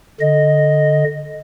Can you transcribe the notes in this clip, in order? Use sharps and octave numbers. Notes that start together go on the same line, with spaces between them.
D3 D#5